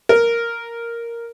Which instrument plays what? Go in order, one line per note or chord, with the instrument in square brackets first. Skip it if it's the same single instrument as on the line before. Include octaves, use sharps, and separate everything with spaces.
[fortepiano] A#4